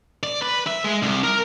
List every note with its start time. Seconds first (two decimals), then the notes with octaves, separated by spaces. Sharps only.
0.23 D5
0.42 B4
0.67 E5
0.84 G#3
1.02 C2
1.24 A#4